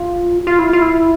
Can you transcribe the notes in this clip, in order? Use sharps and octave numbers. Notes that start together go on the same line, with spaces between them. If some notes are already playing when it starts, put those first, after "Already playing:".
Already playing: F4
F4
E4
F4
E4